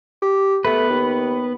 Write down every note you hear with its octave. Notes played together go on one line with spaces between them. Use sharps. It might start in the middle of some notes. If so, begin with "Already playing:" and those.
G4
A3 B3 B4
D#2